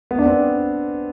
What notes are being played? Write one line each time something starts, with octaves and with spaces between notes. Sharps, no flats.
B3
D4
C4